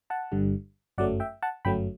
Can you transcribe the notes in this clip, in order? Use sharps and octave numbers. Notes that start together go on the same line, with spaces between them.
F#5 A5
G1 G2 D3 G3
G1 F#2 F#3 A3 D5 F#5
E5 G5
F#5 A5
G1 F#2 F#3 A3 G5 B5